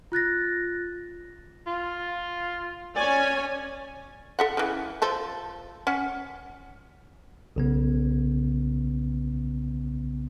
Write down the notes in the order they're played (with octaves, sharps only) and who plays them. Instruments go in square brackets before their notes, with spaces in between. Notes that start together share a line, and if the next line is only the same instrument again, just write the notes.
[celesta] F4 F#6 A6 A#6
[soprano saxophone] F4
[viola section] C#4 C#5 G#5 [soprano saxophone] D5
[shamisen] A4 E5 F#5
C#3 E3
F3 A4 C5
C#4 F#5
[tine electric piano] B1 C#3 B3